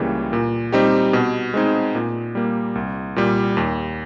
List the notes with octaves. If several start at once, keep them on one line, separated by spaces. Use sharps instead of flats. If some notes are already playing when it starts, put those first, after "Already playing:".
Already playing: C#2 C#3 E3 G3 A#3
A#2
G3 C4 D#4 G4
B2
G#3 C4 D#4
A#2
G3 A#3
C2
A#2 G3
D#2